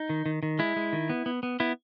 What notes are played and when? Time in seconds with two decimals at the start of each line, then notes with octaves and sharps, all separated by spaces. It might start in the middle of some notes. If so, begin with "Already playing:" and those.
Already playing: D#4
0.10 D#3
0.26 D#3
0.43 D#3
0.59 G#3 E4
0.76 G#3
0.93 D#3
1.10 B3
1.26 B3
1.43 B3
1.60 B3 E4